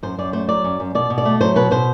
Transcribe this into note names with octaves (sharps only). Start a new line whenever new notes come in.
F#2 C5
F#2 D5
A3 C5
F#3 D5
F#2
F#2
B2 D5
B2
D5
A3
F#3 C5
B2 B4
B2 C5